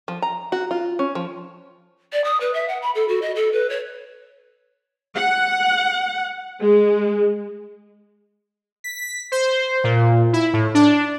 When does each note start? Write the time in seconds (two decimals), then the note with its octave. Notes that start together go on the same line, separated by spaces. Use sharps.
0.08 F3
0.22 A#5
0.52 F#4
0.71 F4
0.99 C#4
1.15 F3
2.12 D5
2.24 D#6
2.40 B4
2.53 E5
2.68 F#5
2.81 B5
2.94 A4
3.08 F#4
3.21 D#5
3.35 A4
3.52 B4
3.69 C#5
5.16 F#5
6.61 G#3
8.84 B6
9.32 C5
9.84 A#2
10.33 E4
10.53 A2
10.74 D4